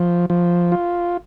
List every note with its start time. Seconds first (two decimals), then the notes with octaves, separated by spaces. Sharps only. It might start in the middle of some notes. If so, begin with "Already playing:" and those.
Already playing: F3
0.30 F3
0.72 F4